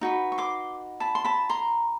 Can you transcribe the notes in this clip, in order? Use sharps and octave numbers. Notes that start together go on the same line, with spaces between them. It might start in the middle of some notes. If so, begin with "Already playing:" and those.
D#4 F#4 B4
C#6
C6 D6
A5 B5
C6
A5 B5
A#5 C6